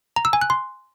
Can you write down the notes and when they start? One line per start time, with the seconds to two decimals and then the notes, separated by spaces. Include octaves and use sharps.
0.16 A#5
0.25 E6
0.33 G#5
0.41 F#6
0.50 C6